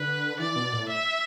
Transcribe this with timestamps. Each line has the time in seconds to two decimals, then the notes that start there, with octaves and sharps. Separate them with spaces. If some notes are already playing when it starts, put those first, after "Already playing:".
Already playing: D3 B4
0.39 E3 D5
0.56 B2
0.73 A2
0.89 E5